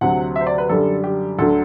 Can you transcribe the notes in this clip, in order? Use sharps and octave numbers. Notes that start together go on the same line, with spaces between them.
D2 C3 F#3 F#5
E5
C5
D5
B4
F#2 D3 G3 A4
G4
D2 D3 F#3 A4